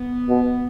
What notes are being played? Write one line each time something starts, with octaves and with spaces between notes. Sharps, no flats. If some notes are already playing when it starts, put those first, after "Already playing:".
Already playing: B3
B2